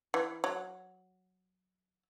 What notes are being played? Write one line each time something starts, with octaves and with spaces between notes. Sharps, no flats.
E3
F#3